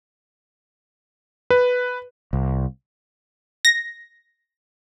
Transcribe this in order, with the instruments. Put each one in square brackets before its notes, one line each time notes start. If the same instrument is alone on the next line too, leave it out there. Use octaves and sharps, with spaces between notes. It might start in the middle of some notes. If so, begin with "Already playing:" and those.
[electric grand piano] B4
[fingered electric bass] C2
[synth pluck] A#6